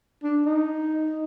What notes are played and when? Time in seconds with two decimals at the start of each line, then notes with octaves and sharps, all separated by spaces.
0.23 D4
0.45 D#4